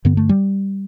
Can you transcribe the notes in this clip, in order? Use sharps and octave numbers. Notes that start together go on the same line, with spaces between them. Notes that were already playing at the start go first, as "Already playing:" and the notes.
G2 D3 B3
A3
G3